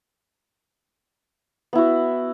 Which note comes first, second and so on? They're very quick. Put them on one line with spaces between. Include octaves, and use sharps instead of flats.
B3 E4 F#4